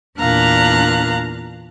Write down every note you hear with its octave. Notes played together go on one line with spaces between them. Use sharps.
E2 A#2 D4 F5 A#5 F#6